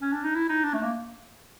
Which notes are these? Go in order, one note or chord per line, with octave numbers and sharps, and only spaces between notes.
C#4
D4
D#4
E4
D#4
D4
A3
A#3